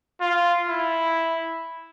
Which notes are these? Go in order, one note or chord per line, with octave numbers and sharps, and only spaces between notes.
F4
E4